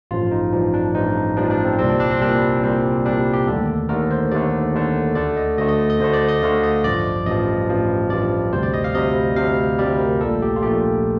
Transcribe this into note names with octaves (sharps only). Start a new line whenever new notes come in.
A1 G2 F3 F4
D#4
A1 G2 F3 D4
D4
A1 G2 F3 D#4
A1 G2 F3 D4
D4
C4
C2 A#2 G3 C4
D4
D4
C4
C2 A#2 G3 D4
C2 A#2 G3 C4
C2 A#2 G3 D4
G4
G4
D#2 D3 A3 A4
D#2 D3 A3 A#4
C5
D#2 D3 A3 D5
D#2 D3 A3
D2 D3 A3 D5
D#5
D2 D3 A3 D#5
D#5
D#5
D2 D3 A3 C5
D5
D#5
D2 D3 A3 F5
D#5
A1 G2 F3 D5
A1 G2 F3 D#5
A1 G2 F3
A1 G2 F3 D5
D2 C3 G3 C5
D5
D#5
F5
D2 C3 G3 D#5
D2 C3 G3 F5
D2 C3 G3 D5
A#4
A#1 A#2 A3 A4
G4
F4
A#1 A#2 A3 G4